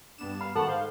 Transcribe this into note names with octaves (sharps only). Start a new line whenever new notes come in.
G2 B3 D4 E7
F5 B5
G#2 D#3 A4 F#5 A5 B5 C#6
C5 F5